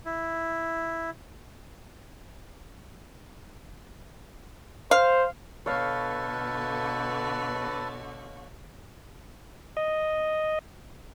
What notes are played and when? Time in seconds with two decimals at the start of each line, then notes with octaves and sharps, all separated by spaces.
0.05 E4
4.91 C5 F5
5.66 B2 D3 F#4 A4 B4 C#5 F5
9.77 D#5